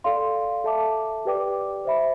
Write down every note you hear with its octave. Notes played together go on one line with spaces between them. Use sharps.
A4 D5 F5 C6
A4 E5 A5 D6
G4 B4 D5 G5 D6
C5 E5 B5